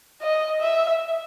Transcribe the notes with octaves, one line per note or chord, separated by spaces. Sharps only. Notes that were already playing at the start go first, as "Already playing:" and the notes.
D#5
E5